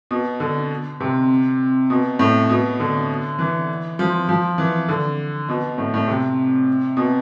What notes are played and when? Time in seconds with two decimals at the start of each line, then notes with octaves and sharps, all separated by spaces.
0.11 B2
0.40 D3
1.00 C3
1.90 B2
2.19 A2
2.50 B2
2.80 D3
3.39 E3
3.99 F3
4.29 F3
4.58 E3
4.89 D3
5.49 B2
5.78 A2
5.94 A2
6.08 C3
6.97 B2